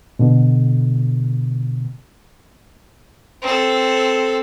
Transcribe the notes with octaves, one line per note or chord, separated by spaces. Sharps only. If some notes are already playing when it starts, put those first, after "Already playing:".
B2 D3
C4 A4